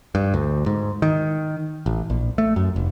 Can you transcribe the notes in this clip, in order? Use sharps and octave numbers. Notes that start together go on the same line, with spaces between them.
G2
D2
G#2
D#3
A1
A#1
A3
F#2
F1